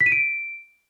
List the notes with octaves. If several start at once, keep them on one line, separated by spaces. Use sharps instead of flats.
B6
D#7
D7